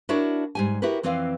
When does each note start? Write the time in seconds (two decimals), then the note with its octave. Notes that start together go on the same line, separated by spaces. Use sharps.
0.09 D4 E4 F#4 A#4 C#5 D5
0.55 G#2 G3 G#5
0.82 E4 F#4 G4 A#4 B4
1.03 F2 E3 C4 B4 D5 F5